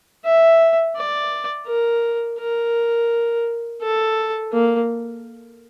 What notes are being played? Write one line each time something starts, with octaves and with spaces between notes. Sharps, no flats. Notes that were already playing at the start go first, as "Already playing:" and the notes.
E5
D5
A#4
A#4
A4
A#3